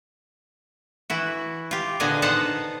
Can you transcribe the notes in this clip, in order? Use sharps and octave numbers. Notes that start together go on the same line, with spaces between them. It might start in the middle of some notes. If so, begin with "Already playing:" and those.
E3 E4 F#4
F4 G4
A#2 D3 B3 G#4 D#5 G#5
B3 D#4 C5 F#5 A5 A#5